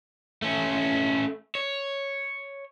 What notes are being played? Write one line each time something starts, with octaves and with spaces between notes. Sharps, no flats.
A3 C#4
C#5